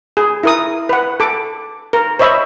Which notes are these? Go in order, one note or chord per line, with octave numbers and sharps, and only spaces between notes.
G#4
E4 A#4 D#6
B4 F#5
A4 D6
A#4
C5 C#5 D#5 E5 B5